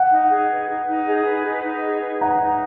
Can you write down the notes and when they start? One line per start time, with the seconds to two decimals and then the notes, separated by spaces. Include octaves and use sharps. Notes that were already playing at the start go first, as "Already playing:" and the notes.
Already playing: F#5
0.11 D#4
0.31 G#4
0.50 B4
0.69 D#4
0.87 D#4
1.07 G#4
1.25 B4
1.45 D#4
1.65 D#4
1.83 G#4
2.02 B4
2.21 D#4 F#5 A#5
2.41 D#4